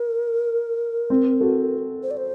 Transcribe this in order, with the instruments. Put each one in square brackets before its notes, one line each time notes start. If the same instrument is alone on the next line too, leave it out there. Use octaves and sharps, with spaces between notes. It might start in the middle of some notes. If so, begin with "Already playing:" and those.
Already playing: [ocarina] A#4
[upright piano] C4
F#4 A4
[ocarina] C5
D5
C5